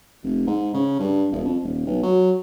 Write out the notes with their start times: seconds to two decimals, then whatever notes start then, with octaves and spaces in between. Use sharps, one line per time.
0.23 F1
0.47 G#2
0.74 C#3
0.99 G2
1.31 E1
1.44 F2
1.63 D#1
1.86 B1
2.03 F#3